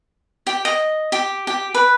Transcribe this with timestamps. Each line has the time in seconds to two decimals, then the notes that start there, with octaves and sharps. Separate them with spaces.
0.47 G4
0.65 D#5
1.12 G4
1.47 G4
1.74 B4